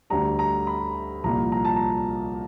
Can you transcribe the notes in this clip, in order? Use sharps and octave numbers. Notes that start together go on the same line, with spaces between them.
D2 D3 G3 A#5
A#5
B5
C2 A#2 F3 A#5
A#5
A5
A#5